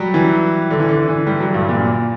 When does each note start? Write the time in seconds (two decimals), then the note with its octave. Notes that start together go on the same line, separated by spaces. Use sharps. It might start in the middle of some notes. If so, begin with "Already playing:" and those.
Already playing: F#3 G3
0.14 E3
0.70 D3
0.80 E3
0.89 D3
1.08 E3
1.27 G3
1.40 F#3
1.54 G2
1.69 A#2